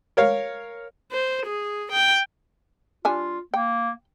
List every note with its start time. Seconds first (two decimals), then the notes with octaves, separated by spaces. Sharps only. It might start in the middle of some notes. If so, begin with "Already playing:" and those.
0.17 A#4 C#5 F5
1.12 C5
1.46 G#4
1.92 G5
3.05 G3 D4 F4 G#5
3.54 A#3 G5